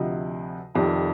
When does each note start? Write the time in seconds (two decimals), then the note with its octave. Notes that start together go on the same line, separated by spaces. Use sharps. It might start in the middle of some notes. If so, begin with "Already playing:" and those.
Already playing: D2 C3 F3 D#5
0.75 F1 F2 C3 D#3